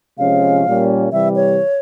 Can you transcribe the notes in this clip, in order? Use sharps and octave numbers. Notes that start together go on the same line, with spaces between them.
C3 F3 G#3 C#4 F5
A#2 G3 A#3 C#4
C3 E3 G3 E5
C#5